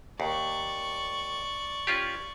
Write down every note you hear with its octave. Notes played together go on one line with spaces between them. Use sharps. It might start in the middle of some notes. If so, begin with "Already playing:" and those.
D#2 D5 C#6
C#4 F4 G4